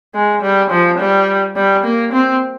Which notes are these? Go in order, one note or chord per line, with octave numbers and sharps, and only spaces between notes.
G#3
G3
F3
G3
G3
A#3
C4